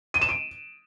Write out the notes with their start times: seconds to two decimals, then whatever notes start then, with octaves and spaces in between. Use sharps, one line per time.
0.14 D#7
0.21 E7
0.29 D7